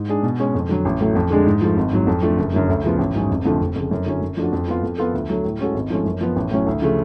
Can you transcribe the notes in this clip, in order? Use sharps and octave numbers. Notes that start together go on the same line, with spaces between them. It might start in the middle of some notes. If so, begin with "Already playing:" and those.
Already playing: G#2
G#3 D4 G#4
B2
G#3 C#4
F2
D3 F#3
A1
A2 F#3 A3
F2
D3 G#3 D4 G#4
G#2
F3 A3
G#1
G#2 F#3
F2
F3 A3 D4
F#1
F#2 D3 F#3
D2
C#3 F3 B3
A1
G#2 F#3 C#4 G#4
F1
F2 D3 F3 A3
F1
F2 C#3
F#2
D3 F#3 C#4
F#2
F3 A3 D4 F#4
F2
F3 B3 F4
F2
F3 B3 F4 A4
D2
D3 F#3 A3
A2
G#3 C#4 F#4 A4
G#1
G#2 F3 A3 C#4
F#2
F3 B3
A1
A2 F#3 C#4
D2
C#3 F3 A3